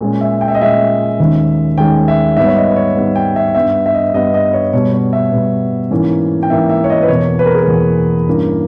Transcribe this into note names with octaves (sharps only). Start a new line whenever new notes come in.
A#2 G#3 C#4
E5
G5
E5
D#5
A#2 G#3 C#4 E5
D#2 D#3 G#3 C#4
D#2 D#3 G#3 C#4 G5
E5
G#2 G3 B3 E5
C#5
D#5
B4
C#5
G#2 G3 B3
G5
E5
G2 G3 B3 E5
E5
D#5
G2 G3 B3 D#5
D#5
C#5
B2 G3 B3 C#5
C#5
E5
B2 G3 B3
G#2 E3 A#3 C#4
G5
G#2 E3 A#3 C#4 E5
E5
C#5
D#5
B4
E2 B2 A#3 C#5
B4
A#4
G#4
A#4
E2 B2 A#3
G2 E3 A#3 C#4